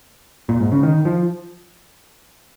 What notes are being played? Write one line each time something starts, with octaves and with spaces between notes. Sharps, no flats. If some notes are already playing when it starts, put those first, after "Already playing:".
A#2
G#2
C#3
D#3
F3